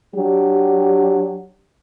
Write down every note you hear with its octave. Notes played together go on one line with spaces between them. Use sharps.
F#3 D4 G4